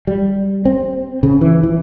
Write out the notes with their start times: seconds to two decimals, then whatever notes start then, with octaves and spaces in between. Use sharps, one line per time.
0.07 G3
0.65 C4
1.23 C#3
1.41 E3
1.63 E3